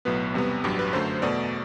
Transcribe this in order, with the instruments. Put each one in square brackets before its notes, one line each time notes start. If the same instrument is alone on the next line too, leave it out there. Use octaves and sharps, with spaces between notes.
[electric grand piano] B1 A2 F#3 B3 B4
E2 C3 G3 B3
A1 G2 F#3 G4
B4
F#2 D3 F#3 A3 C5
E2 B2 A3 D5